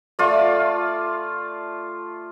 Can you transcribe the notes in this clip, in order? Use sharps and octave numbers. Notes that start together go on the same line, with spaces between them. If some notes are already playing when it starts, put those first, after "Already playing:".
A3 F4 D5